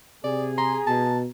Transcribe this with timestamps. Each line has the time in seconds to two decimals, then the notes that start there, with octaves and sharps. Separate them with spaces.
0.24 C3 G#4 D5
0.58 A#5 C6
0.87 B2 A5